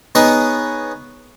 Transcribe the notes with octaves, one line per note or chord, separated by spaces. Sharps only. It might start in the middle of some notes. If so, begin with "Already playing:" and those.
B3 D#4 G#4 C#5 D#5 F#5